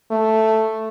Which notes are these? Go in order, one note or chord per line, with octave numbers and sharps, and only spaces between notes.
A3